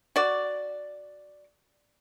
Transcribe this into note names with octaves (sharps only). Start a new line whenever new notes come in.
F#4 D5